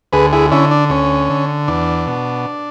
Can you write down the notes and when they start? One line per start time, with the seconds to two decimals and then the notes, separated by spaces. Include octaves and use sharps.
0.13 D2 G#4 B4
0.33 E4 G#4
0.51 D3 C#4 E4
0.71 D4
0.90 D2 C#4
1.30 D3
1.68 E2 D4
2.07 B2